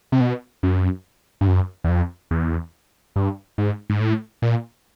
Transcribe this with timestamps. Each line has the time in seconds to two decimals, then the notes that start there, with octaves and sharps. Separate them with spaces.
0.12 C3
0.20 B2
0.63 F#2
1.41 G2
1.47 F#2
1.84 E2
1.89 F2
2.31 E2
3.16 G2
3.58 G#2
3.90 G#2
4.00 A2
4.42 A#2